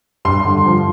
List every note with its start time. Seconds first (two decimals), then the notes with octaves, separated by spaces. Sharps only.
0.25 G2 C6
0.45 D3
0.66 F3